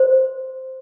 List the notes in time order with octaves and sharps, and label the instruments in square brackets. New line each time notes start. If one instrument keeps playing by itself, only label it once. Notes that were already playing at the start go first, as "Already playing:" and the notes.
Already playing: [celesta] C5